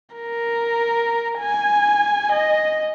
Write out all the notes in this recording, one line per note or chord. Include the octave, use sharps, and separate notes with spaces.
A#4
G#5
D#5